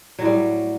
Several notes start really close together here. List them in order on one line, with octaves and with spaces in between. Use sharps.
F#3 A2 G3